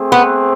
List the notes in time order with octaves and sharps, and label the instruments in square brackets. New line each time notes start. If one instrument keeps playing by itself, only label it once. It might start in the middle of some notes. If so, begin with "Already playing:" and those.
Already playing: [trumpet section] A3 C4 G#4 C5
[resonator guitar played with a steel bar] B3